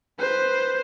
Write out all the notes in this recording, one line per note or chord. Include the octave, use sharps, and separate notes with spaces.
B4 C5